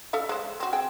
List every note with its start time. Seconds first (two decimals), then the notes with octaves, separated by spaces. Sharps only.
0.13 A4 E5 F5
0.29 G#3 C5
0.60 C4 F#4
0.73 C4 G#4 G5